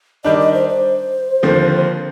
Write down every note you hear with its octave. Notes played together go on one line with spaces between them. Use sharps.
D#3 G3 D4 D#5
D#5
C5
C5
D#2 D3 F3 C4